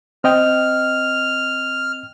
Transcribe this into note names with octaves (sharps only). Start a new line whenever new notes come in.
C4 D#5 G5 F6